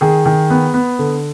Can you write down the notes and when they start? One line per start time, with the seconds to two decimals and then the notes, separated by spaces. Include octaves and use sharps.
0.01 D#3 G#4
0.26 D#3
0.50 B3
0.74 B3
0.99 D3